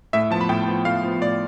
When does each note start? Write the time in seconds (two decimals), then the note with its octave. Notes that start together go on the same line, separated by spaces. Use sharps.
0.13 A2 E5
0.30 F3 B3 A5
0.41 B5
0.49 A2 G5
0.68 F3 B3
0.85 A2 F5
1.03 F3 B3
1.21 A2 D5